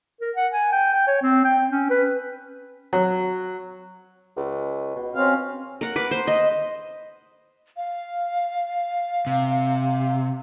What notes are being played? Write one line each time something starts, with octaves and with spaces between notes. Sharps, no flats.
A#4
F#5
G#5
G5
G5
C#5
C4
G5
C#4
B4
F#3
C#2
B2
C4 C#4 F5
A#4 F#5
B4 D6
C5
D#5
F5
C3